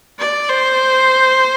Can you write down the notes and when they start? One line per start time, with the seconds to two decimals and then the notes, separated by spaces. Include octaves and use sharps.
0.19 D5
0.49 C5